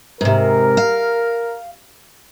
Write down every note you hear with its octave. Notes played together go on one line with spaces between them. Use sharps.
G#2 C3 A#4
F5